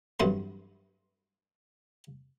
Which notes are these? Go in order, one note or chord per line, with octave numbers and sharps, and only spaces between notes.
A1 G2 C3 F#3 B3 C6